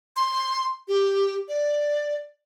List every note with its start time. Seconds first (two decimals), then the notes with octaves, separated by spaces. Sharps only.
0.17 C6
0.88 G4
1.48 D5